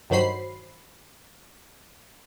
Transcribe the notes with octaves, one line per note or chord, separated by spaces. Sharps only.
G2 D#3 F#3 C5 B5 C7